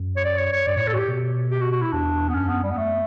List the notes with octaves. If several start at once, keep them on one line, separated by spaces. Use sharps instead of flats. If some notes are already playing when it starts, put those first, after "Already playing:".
Already playing: F#2
C#5
D5
C#5
C#5
G2 D5
A2 C#5
A2 A4
F#4
G4
B2
G4
F#4
F#4
E4
E2 D4
B3
F#2 C#4
B3
G3
B3
A3